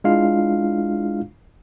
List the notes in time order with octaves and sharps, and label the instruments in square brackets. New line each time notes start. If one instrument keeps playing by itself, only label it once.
[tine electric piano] G#3 D4 E4 F4 F5